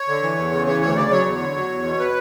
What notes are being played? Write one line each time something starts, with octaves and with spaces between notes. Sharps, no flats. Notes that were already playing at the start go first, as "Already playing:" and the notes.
Already playing: C#5
D3
E3
E2
C#3
E3 C#5
D2 C#5
C#3 D5
F#3 C#5
E2
D3
F#3
E2
B2
B4